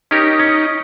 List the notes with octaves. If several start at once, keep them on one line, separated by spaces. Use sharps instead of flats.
C#4 D#4 G4 A#4
C#4